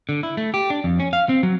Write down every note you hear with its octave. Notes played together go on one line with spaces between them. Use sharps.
D3
E4
A3
G4
D4
F2
C#4
F5
C4
F#3